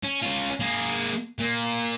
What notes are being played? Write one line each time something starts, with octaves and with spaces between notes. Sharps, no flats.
C#4
C#4 F4
A#3 G#4
A#2 A#3